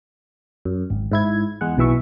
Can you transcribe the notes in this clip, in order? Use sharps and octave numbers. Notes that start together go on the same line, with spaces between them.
F#2
G#1
G#2 E4 G#6
E2 G#3 F#5
B1 B2 E3 E5 C#6